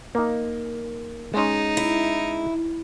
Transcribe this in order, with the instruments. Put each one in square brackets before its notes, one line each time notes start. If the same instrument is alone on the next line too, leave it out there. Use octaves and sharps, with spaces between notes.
[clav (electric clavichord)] A#3 D#4
[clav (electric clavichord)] G#3 C#4 [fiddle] D#4
[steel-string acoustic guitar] E4